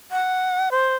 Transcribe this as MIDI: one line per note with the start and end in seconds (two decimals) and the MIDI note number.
0.11 0.69 78
0.71 0.96 72